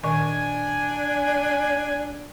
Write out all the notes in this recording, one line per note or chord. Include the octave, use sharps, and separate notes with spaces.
A#2 D#3 D4 G#5 C#6